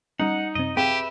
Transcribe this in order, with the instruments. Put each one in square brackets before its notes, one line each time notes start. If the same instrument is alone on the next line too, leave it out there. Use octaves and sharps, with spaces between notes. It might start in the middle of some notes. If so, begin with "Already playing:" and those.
[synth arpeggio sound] G3 C#4 [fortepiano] D#4 [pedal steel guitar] F#5
[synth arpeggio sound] F#2 C3 C4 [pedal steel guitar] D#5
[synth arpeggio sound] C4 G#4 F5 [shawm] G4 [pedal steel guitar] B4 E5 [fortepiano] G5